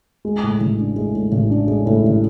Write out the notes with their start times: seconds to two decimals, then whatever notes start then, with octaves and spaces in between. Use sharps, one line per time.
0.25 G#3
0.43 A2
0.60 A1
0.79 D4
0.96 G#3
1.14 A2
1.32 A1
1.50 D4
1.67 G#3
1.86 A2
2.03 A1